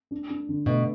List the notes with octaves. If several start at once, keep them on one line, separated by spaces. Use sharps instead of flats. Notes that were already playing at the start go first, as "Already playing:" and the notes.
D4
D4
D3
B2 A3